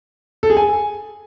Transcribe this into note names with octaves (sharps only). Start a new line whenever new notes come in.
A4
G#4
G#5